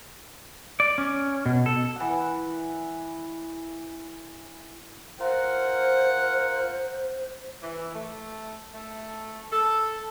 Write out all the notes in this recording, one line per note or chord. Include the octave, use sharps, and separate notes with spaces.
D5
C#4
B2
A4
E3 F#5
F4 A#4 C5 F#5
E3
A3
A3
A4